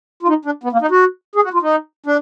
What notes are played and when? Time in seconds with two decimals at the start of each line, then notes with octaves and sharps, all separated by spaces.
0.23 F4
0.28 D#4
0.45 D4
0.64 B3
0.73 A#3
0.81 D#4
0.91 F#4
1.36 G#4
1.44 F#4
1.53 F4
1.62 D#4
2.06 D4